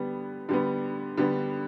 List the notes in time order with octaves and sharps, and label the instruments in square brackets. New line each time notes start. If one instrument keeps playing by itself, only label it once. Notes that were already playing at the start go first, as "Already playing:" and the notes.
Already playing: [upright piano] D3 G3 B3
D3 G3 B3
D3 G3 B3